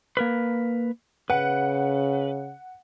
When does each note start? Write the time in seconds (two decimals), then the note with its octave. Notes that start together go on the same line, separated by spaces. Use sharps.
0.17 A#3 A#4 B4
1.30 C#3 B4 F#5